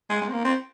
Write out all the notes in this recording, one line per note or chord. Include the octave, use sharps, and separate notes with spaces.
G#3
G#3
C4
A#3
C4